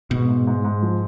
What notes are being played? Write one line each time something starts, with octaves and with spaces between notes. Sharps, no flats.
G#2 B2
G#2
G#2
G#2
F3